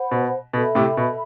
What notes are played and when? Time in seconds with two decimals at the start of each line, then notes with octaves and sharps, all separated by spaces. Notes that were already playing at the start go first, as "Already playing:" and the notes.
Already playing: C5 F#5 B5
0.11 B2
0.53 B2 A4 E5 B5
0.75 A2 C3
0.97 B2